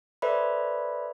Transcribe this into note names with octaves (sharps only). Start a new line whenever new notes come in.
A4 B4 C5 D5 E5 B5